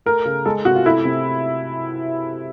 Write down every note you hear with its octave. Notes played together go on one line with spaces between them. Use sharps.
A3 A#4
C#3
G#3 A4
C3 F#4
F4
A3 E4
C3